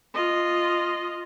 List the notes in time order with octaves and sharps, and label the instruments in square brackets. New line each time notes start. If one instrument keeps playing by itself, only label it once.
[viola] F4 D#5